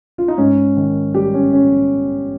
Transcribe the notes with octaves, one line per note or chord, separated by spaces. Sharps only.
F4
D#4
G#2 C#4
D#3
G3 G4
C#4
C#4